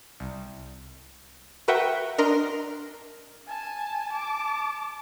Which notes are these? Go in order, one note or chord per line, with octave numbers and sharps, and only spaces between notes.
C2
F#4 A#4 B4 E5 F#5 G5
D4 A#4 D#5 C6
G#5 A5
A5 D6